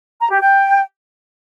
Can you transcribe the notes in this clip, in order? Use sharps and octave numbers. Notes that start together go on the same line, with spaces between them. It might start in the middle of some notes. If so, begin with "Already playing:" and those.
A#5
G4
G5